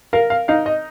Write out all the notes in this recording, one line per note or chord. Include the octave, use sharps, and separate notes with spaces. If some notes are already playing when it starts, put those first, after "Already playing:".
A#4 F5
F5
D#4 F5
D#5